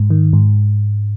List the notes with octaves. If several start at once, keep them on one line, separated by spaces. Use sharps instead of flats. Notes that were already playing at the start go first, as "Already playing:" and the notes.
Already playing: G#2
D#3
G#2